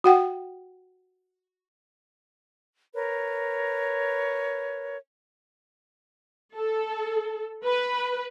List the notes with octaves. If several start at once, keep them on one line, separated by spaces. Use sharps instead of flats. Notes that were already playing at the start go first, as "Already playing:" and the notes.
F#4 F#5 G5
A#4 B4 C#5
A4
B4